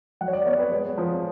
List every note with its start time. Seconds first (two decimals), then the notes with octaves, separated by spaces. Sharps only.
0.21 F#3 F#5
0.28 C#5
0.33 D5
0.46 B3 C#5
0.58 B4
0.72 G#3 C#5
0.98 F3